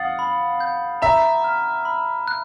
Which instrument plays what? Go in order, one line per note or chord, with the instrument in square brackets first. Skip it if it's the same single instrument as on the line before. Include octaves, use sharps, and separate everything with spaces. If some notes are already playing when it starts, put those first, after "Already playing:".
Already playing: [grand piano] F5 F#5 [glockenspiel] D#6 A6
[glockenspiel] B5
G6
[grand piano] E5 [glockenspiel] A#5
[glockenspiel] F6
B5
F#6